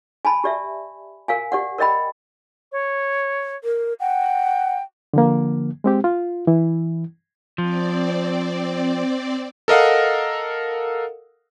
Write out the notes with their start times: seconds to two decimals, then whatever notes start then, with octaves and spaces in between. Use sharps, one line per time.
0.25 G#5 A5 B5
0.44 G4 D5 E5
1.28 A#4 F5 G#5
1.52 G4 D5 F#5
1.78 A#4 D5 D#5 G5 B5
2.72 C#5
3.64 A#4
4.00 F#5 G5
5.13 D3 F3 A#3
5.84 G#3 C4 G4
6.04 F4
6.47 E3 E4
7.58 F3 C4 D5
9.68 A4 A#4 D#5 F5 F#5